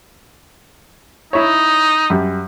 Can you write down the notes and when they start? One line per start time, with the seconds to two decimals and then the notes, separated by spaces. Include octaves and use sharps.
1.33 D#4 E4 C#5
2.10 F#2 G3